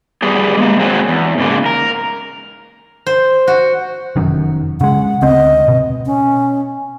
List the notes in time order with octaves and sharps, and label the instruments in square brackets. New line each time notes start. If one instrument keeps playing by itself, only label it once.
[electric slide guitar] G3 B3 G4 G#4
G#3 A#3
F#3 G#3 C4
E2
G#2 C#3 A#3
A#4
[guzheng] C5
F#4
[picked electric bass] F1 F#2 D#3
[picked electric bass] C#3 G#3 [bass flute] F#5
[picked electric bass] D2 C#3 C4 [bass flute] D#5
[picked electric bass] B2
[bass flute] C#4